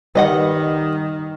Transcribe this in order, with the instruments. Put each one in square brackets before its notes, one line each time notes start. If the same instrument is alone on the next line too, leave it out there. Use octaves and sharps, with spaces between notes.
[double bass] D#3 [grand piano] G3 [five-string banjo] B4 D#5 F#5